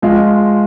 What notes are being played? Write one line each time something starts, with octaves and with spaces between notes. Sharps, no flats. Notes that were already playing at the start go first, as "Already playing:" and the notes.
F3 G#3 F4